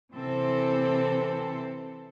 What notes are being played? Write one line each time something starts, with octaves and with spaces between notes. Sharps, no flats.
C3 E3 C4 A4